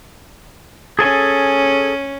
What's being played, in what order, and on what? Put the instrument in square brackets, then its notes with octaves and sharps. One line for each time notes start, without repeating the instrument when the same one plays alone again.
[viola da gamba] C#4 [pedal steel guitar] G#4 A4 G#5